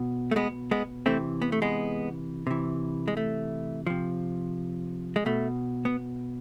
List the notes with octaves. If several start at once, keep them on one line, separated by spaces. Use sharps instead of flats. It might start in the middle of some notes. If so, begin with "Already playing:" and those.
Already playing: B2
A3
G#3 B3
G#3 B3
C3 E3 A3 C4
B3
A3
G#3 B3
C3 E3
G#3
A3
C3 F3
G#3
B2 A3
B3